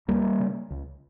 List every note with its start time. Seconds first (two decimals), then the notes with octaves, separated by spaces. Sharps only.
0.08 C#2 G3 A#3
0.39 C#3
0.71 C#2